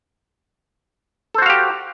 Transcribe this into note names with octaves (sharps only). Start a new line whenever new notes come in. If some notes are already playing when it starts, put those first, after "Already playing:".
F#4 G4 A4 C5 F5